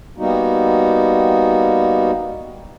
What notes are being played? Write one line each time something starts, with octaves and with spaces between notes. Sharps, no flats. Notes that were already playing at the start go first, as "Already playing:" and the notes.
G3 A#3 B3 D#4 F#4